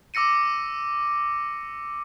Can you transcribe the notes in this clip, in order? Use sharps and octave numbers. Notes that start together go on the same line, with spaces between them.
D6 E6 A#6 C#7 D#7